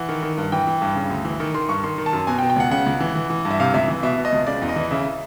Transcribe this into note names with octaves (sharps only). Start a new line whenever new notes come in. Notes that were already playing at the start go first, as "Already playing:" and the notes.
Already playing: E3 F#5
D#3
D#3
G2
E3 G5
E3
G2
C#3
D2
E3
D#3
D#3 C6
G2 C#6
D#3 C6
D#3
A5
F#2
B2 G#5
G5
B2
G5
C#2 F#5
C#3 F#5
C#2
E3
E3
E3
G2
E5
C3 F5
C#2 E5
E3
B2 E5
B2
D#5
C#2
C#3 D5
E2
D#5
E3
C#3 E5